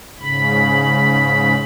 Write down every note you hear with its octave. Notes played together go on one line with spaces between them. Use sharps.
G#2 C#3 B5